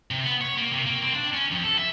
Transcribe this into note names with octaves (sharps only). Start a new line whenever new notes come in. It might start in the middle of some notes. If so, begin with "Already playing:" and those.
C3
B3
C#5
A#3
C3
A#3
C4
D4
C#4
F2
A4
E5